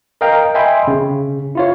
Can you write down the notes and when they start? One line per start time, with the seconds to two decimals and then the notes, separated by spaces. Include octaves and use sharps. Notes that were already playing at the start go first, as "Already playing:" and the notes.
0.21 A#4 D#5 F5 G5 A#5
0.55 D#5 E5 G5 G#5 B5 C6
0.87 C#3
1.55 E4 F4 C#5